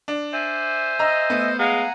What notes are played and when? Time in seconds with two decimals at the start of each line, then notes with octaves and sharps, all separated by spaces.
0.08 D4
0.33 C5 E5 G#5
0.99 D#5 A#5 E6
1.30 A3 B3
1.59 G#3 F5 F#5 G#5 A#5